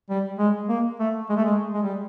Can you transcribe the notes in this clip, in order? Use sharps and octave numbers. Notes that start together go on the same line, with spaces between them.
G3
G#3
A#3
A3
G#3
A3
G#3
G#3
G3